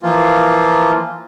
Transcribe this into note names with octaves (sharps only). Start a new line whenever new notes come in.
E3 F3 A#3 F4